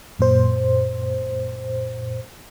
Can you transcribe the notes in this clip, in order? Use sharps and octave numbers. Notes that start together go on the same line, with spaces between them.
F#2 A#2 C5